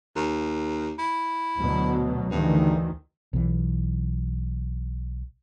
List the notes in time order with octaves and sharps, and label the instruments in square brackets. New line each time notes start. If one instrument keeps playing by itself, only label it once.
[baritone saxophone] D#2
E4
[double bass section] D2 B2 F#3
[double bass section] D2 D#3 E3 [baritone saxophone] G2
[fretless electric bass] B1 E3